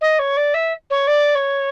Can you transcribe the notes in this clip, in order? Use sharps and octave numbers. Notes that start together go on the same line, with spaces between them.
D#5
C#5
D5
E5
C#5
D5
C#5